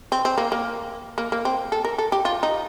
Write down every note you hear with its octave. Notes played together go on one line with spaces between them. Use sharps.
C4
C4
A#3
A#3
A#3
A#3
C4
A4
A#4
A4
G4
F4
D#4